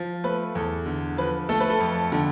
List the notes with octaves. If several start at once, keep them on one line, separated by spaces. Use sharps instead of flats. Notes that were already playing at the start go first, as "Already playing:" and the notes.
Already playing: F3
A3 B4
E2 A4
D3
F3 B4
A3 A4
B4
A4
F2
D3